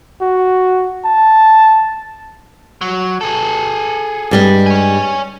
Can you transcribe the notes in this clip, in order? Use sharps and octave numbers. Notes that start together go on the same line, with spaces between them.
F#4
A5
F#3
G#4 A4
G2 G3 G#3
C#5 G#5